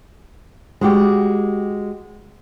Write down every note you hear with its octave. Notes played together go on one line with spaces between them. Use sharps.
G#3 F#4 G4